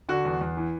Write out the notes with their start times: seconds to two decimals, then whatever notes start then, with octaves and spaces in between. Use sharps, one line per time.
0.09 D3 F#4
0.25 E2
0.41 E2
0.57 E3